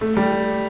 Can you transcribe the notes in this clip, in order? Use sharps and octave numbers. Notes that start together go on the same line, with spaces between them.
A3
G3